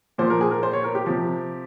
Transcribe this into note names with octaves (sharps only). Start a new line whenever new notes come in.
A#2 F3 C5
A#4
G#4
A#4
C5
C#5
A#4
G4
C3 F3